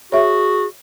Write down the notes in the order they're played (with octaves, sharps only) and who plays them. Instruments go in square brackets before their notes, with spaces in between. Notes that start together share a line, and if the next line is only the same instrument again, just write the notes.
[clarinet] F#4 [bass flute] G#4 [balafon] C#5 E5